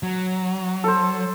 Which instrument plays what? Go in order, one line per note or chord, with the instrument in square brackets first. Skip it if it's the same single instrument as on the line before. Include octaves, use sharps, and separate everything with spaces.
[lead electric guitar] F#3
[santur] A4 C5